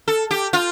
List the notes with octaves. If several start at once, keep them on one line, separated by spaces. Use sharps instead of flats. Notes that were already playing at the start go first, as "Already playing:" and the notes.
A4
G4
F4